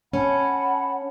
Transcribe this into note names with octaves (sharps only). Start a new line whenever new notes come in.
C#4 F#5 A5 B5